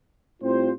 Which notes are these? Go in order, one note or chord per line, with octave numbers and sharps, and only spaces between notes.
A2 G3 C4 F4 C5